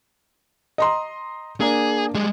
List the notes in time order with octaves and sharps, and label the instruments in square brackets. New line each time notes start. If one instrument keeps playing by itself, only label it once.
[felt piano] D#5 A#5 C6
[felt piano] A#3 D4 [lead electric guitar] G#4
[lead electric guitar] G3 G#3